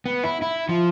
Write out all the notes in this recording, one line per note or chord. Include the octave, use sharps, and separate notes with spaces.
B3
E4
E4
F3